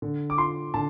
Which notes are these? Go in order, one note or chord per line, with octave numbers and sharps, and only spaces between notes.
D3
D6
F4 C6
D3 A5